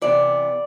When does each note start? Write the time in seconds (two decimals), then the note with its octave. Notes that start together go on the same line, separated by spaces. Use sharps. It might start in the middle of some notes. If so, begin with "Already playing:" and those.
0.01 C3 E3 B3 D5